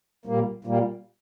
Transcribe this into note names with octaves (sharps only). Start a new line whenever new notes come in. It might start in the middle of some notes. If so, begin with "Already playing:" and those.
A#2 G3 A#3
A#2 G3 A#3